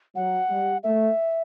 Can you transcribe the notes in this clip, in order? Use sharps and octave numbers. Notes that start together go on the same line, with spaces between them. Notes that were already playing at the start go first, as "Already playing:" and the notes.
F#3 F#5
G3
A3 E5